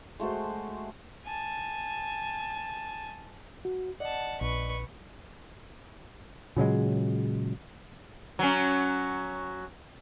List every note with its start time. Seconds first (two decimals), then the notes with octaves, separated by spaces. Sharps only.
0.20 G#3 A3 F#4 C5
1.25 G#5 A5
3.65 F#4
4.00 D5 D#5 F#5 A5
4.41 A#1 B4 C#6
6.56 A#2 C#3 F#3 G#3
8.39 F#3 C#4